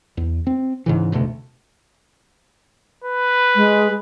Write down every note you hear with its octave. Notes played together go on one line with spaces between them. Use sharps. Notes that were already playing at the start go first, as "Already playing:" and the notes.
E2
C4
G#2 C#3 E3
F1 D2 B2 A3
B4
G#3